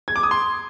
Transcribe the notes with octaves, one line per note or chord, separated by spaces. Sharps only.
G#6
D6
D#6
C6